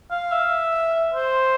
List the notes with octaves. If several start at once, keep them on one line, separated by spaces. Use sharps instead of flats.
F5
E5
C5